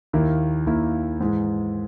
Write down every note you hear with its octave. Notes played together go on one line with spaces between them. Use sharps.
D#2 D#3 A#3 E4
D#2 D#3 A#3 E4
G#2 E3 G#3